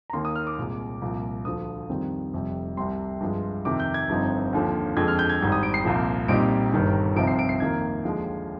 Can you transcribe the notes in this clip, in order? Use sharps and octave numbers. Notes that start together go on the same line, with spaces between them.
A#5
D#2 D#3 A#3 C6
D#6
F6
D6
C2 A#2 G#3
C2 A#2 F3
D2 D3 F3 D#6
F2 D#3 G3 C4
F1 F2 C3 G3
C2 C3 G3 C6
G2 F3 G#3
F2 C3 D#3 D6
G6
G#6
G1 G2 F3 C4 D#4
D#2 D3 F3
F2 D3 G#3 G#6
F6
G6
G#6
G#1 G#2 G3
D#6
D7
C7
C2 A#2 F3
A#1 A#2 G3 C4 D#4 D7
G1 G2 D#3 G3
C2 C3 F3 C4 D#4 D7
C7
D7
C7
F2 D#3 A#3 G#6
D#2 D3 F3 G#3